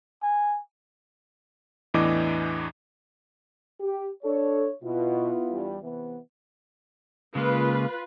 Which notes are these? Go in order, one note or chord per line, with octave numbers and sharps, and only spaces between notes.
G#5
E2 A2 E3 D4 D#5 D6
G4
D4 A4 C#5
B2 B3 E4 F4
E2 G2 G3
C3 E3 B3
C#3 G#3 A#3 F4 B4